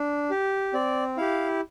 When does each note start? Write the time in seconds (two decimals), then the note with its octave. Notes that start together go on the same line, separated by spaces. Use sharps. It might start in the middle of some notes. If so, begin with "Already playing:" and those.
Already playing: D4
0.30 G4
0.74 C4 D5
1.17 E4 G4 F5